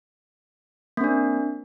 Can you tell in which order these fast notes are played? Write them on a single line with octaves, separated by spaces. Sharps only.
A#3 C4 D4